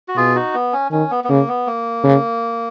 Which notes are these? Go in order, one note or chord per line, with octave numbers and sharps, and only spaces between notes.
F#4
B2 F4 G#4
D#4 F#4
B3
C#4
D#3 C#4
B3
B3
C#3 A#3
B3
A#3
C#3